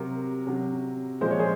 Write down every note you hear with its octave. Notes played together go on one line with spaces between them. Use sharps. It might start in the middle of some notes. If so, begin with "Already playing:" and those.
Already playing: C3 F#3 A#4
C3 F#3
A#2 F3 G#3 C5
C#5
G#4 C5